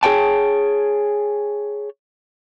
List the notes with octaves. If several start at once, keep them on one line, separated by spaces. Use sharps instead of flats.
G#4 A#4 C#5 G5 A5